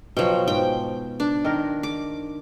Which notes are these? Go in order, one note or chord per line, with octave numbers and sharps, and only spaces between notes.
B2 F3 F#3 G5
G#2 G5
D4
D#3 A#4
D6